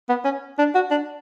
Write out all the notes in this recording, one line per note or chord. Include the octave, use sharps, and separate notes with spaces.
B3
C#4
D4
F#4
D4